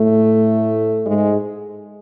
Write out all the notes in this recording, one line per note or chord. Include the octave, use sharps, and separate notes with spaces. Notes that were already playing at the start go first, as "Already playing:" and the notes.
Already playing: A2 A3
G#2 G#3